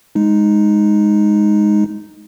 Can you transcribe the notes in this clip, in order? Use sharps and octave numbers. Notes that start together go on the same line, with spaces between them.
G#3 D#4